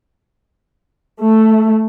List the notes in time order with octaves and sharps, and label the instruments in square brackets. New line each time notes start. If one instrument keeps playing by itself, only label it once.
[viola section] A3